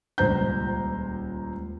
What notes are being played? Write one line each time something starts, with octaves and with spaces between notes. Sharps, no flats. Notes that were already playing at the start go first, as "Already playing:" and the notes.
D#1 C#2 C5 A#5 G6